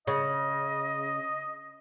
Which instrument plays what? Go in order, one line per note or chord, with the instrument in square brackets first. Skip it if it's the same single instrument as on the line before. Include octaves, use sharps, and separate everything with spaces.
[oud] C#3 [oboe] D#5